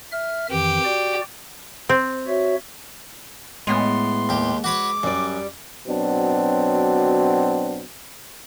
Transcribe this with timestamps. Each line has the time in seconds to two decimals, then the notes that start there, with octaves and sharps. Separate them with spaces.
0.12 E5 F6
0.51 F2 D#3 E3 G4
0.85 F#4 D5
1.89 C4
2.27 F#4 C#5 E5
3.67 A2 G#3 B3 C6
4.29 D#2 G4
4.64 F#4 B4 C#5 D6
5.03 F#2 G3 D5
5.87 B2 F#3 C4 D4